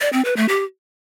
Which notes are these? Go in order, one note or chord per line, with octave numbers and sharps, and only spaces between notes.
D5
C4
B4
A3
G4